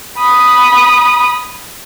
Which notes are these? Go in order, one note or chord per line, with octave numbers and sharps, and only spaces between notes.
B5 D#6